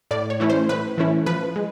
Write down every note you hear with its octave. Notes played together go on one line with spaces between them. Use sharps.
A2 D5
C#5
E3 A3 C#4 E4
C5
A2 B4
E3 A3 C#4 E4
F3 B4
G#3